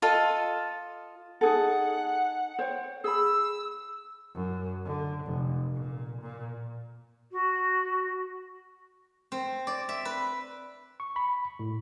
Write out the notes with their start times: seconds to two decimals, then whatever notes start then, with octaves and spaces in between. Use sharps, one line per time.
0.02 F4 A4 D#5
1.41 D#4 G#4 A4 F#5
2.59 C5 C#5 G5
3.04 G#4 B5 E6
4.34 F#2
4.85 D3
5.24 F1
5.75 A#2
6.21 A#2
7.31 F#4
9.32 C4
9.67 D5
9.89 E5
10.05 B4
11.00 C#6
11.16 B5
11.59 A2